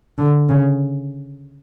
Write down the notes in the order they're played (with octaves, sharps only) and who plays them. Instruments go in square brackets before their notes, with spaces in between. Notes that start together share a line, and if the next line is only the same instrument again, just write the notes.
[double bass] D3
C#3